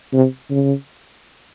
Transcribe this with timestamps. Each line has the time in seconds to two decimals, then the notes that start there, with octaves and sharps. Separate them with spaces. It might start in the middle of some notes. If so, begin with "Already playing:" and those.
0.13 C3
0.51 C#3